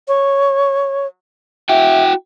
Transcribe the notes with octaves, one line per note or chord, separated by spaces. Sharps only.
C#5
E4 F#4 E5 G5